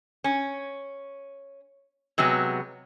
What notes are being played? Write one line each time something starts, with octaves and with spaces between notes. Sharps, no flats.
C#4
C3 F#3 G#3 B3